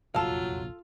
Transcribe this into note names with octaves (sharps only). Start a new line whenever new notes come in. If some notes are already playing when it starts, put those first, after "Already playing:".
F1 A#1 E2 F#3 F4 A4 F5